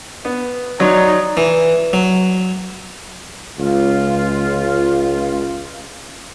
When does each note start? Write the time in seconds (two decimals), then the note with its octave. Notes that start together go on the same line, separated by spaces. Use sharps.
0.25 B3
0.80 F#3 D#4 C#5 D5 C6
1.37 E3
1.93 F#3
3.60 C#2 F4